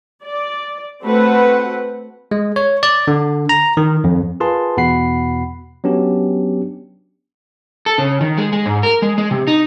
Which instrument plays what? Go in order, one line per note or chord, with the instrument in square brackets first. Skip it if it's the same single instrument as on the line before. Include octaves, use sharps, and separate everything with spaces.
[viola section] D5
A3 C4 F#4 B4 F#5
[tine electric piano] G#3
C#5
D5
D3
A#5
D#3
F2
F4 G#4 A#4 B4 A5 C6
E2 B2 F#5 B5 C7
F#3 B3 C#4 D4 G4
[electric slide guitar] A4
C#3
D#3
G#3
G#3
G#2
A#4
G#3
G#3
C3
D#4